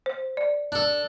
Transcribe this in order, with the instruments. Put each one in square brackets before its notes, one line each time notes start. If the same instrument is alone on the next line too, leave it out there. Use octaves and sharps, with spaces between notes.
[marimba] C5
D5
[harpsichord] D4 A4